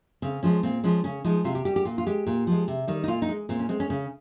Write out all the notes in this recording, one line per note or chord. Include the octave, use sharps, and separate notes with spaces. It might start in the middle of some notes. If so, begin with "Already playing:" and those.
C#3 C4
F3 G#3 C#4
A#2 C4
F3 G#3 C#4
C#3 C#4
F3 G#3 D#4
C3 F4
G4
G3 G4
G4
A#2 F4
F4
G#3 G4
A#2
F3 G#3
C3
D#3 G3
D#4
A#2 F4
D#4
G#3
A#2 C4
C#4
G#3 C4
C#4
C#3 C#4